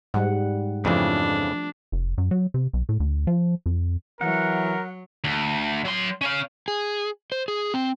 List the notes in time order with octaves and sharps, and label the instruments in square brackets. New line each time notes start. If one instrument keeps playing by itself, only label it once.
[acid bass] G#2 [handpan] G3 F#5
[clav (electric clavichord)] F2 C#3 E3 [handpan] F3 A3 C4 [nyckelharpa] D4
[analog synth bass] F1
F#2
F#3
C3
B1
A2
D2
F3
F2
[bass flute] E3 [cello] F#3 [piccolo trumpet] A#4 [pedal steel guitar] F#5
[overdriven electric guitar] D2
F#3 C6
C#4 F5
[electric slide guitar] G#4
C5
G#4
C4